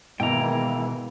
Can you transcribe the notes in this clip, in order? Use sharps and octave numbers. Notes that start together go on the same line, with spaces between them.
B2 D#3 E3 G#3 A#3 E4 G5 A#5